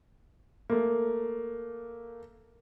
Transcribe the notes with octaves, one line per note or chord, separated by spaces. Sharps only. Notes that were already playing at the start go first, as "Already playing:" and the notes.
A3 A#3